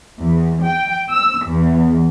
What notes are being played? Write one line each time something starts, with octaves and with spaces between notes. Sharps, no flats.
E2
G5
E6
E2